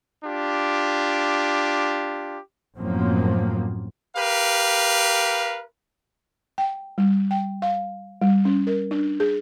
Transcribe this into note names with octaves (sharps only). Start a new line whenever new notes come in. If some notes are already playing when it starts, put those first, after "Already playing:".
D4 F4 G4
F#2 A2 F3 A#3 C4
G4 A#4 B4 F5
G5
G3
G5
F5
G3
C#4
A#4
D4
G#4